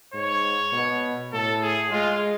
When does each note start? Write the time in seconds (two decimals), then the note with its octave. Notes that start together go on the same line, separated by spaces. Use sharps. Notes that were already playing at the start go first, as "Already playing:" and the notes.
0.14 G#2 C#5
0.73 B2
1.33 A2 A4
1.62 G#4
1.92 G#3 F4